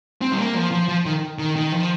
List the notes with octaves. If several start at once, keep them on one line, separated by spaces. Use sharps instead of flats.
C4
G3
A#3
F3
F3
F3
D#3
D#3
D#3
F3